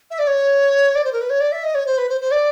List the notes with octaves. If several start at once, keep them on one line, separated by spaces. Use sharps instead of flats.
E5
D5
C#5
D5
C5
A#4
B4
C#5
D5
E5
D#5
C#5
C5
B4
C5
C5
D5